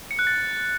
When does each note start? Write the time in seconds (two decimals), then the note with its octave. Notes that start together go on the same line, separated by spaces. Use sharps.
0.11 C#7
0.19 F#6
0.27 A6